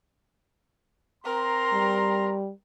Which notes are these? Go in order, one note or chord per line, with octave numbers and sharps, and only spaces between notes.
C4 A#4 A#5 C6
G3